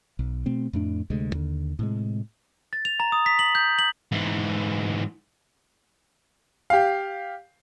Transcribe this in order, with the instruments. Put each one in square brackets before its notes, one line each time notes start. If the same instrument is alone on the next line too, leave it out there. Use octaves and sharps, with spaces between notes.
[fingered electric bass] B1
B2 A3 C4
F2 A2 A3 D4
D2 C3 G#3
D#2 D3
A2 C3 G#3
[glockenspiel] A6
F7
A#5
D#6
B6
F#7
G6
F#7
[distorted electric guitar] G#2 E3
[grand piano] G4 F5